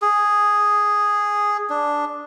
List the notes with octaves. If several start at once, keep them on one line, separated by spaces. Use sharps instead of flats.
G#4
D4